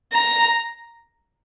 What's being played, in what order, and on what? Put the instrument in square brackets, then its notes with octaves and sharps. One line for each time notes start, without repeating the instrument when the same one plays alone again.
[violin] A#5